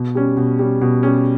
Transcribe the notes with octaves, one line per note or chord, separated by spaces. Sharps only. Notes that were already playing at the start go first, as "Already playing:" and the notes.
Already playing: B2
G3 C#4
B2
G3 C#4
B2
G3 C#4